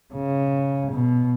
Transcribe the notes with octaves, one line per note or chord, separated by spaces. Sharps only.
C#3
B2